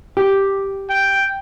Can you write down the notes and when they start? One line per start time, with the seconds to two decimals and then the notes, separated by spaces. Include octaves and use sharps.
0.17 G4
0.90 G5